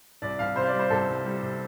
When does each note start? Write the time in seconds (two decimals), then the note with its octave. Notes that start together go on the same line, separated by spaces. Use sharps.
0.22 C2 D5
0.39 C2 F5
0.56 C3 C5
0.62 F5
0.67 D5
0.73 G3
0.79 C5
0.90 C2 A4
1.08 C2
1.25 G3
1.41 C3